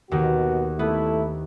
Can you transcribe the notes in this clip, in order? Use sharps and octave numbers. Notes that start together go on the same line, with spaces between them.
D#2 B2 D#3 F#4
A3 B3 E4